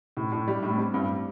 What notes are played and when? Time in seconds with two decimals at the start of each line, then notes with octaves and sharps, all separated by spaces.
0.17 A2 C3
0.32 A2 D4
0.48 G3
0.62 A2 D4
0.71 A3
0.77 G3 C4
0.94 G2